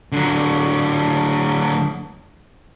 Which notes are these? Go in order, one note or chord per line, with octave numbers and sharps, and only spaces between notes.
D3 F#3